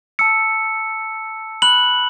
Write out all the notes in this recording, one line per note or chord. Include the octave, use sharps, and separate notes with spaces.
A5 E6 C#7
B5 F#6 F#7